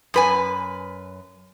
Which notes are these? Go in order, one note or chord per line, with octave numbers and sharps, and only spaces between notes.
F#2 B4 G#5